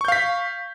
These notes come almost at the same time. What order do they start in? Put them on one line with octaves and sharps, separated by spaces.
C#6 G6 F5 B6